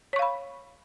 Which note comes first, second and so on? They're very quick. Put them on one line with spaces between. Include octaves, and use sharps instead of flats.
C#5 C#6 F5 B5